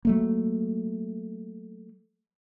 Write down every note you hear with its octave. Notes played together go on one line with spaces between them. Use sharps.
F#3 A3 A#3